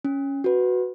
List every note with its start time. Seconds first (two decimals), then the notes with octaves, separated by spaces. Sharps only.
0.04 C#4
0.44 F#4 B4